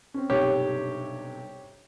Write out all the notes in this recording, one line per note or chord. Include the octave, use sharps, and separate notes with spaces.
C4 C#4
B1 G2 C3 G4 C#5